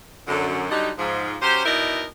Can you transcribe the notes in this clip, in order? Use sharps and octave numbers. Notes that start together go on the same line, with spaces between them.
F#2 D3
D3 F#3 G3 D#4
G#2 F3
F#3 C#4 G4 C5
B2 D#4 E4 A#4 D5 D#5